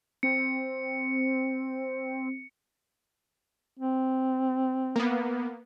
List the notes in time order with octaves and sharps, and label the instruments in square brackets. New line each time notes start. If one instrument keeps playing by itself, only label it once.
[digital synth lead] C4 [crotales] C#7
[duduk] C4
[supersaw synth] A#3 B3